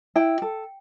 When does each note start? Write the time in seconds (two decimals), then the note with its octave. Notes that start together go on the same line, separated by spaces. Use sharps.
0.16 E4 G5
0.42 A4